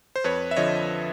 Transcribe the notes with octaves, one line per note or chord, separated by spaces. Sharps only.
C5
F2 B4 C#5
E5
D3 F3 C#5 D#5